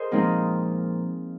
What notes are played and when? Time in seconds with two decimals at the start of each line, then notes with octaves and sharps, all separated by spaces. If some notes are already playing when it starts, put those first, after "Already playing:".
Already playing: G#4 A#4 C5 D#5
0.11 A#2 F3 G#3 C4 D#4 F4